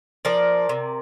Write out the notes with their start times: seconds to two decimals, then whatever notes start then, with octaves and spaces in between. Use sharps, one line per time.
0.25 F3 A#4 D5
0.69 C3